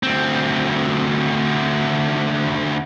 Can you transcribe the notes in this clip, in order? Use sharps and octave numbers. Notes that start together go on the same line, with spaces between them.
D2 C4